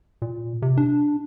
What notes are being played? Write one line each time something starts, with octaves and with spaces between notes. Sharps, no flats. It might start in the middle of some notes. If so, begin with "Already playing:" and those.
A#2
C3
D4